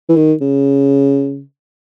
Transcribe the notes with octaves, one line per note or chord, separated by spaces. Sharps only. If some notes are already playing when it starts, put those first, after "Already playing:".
E3
D#3
C#3